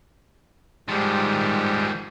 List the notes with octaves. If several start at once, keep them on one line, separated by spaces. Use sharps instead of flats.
G#2 D#3 F3 G3